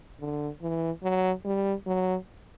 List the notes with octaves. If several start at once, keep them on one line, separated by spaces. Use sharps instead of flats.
D3
E3
F#3
G3
F#3